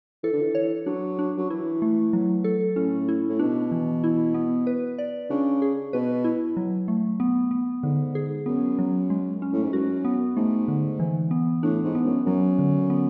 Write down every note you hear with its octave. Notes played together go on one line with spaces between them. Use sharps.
E3 A4
D3
E3
C#5
F#3 D4
D4
F#3
E3 E4
A3
F#3
A4
A2 C#4
E4
A2
B2 D4
E3
E4
B3
B4
D5
C#3 D4
G#4
B2 B4
E4
F#3
A3
B3
B3
G#2 D3
G#4
F#2 B3
F#3
G#3
C#4
A2
G#2
F#2 F#4
B3
G#2 A3
D3
E3
B3
A2 D4
G#2
B3
F#2
F#2 F#3
D3
B3